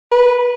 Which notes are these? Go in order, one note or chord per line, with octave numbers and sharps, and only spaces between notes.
B4